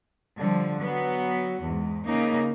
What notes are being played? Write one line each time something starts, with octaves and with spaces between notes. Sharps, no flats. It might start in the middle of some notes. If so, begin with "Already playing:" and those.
D3 F3 G3
F#3 B3
E2 G#2
C#3 A#3 D#4